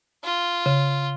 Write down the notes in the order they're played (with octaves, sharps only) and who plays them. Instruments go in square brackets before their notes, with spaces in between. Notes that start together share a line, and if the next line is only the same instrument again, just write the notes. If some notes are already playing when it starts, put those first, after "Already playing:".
[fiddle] F4
[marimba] C#3